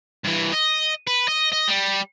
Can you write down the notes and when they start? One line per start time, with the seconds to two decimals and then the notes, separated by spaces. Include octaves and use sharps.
0.24 G2 E3
0.52 D#5
1.07 B4
1.29 D#5
1.53 D#5
1.69 G3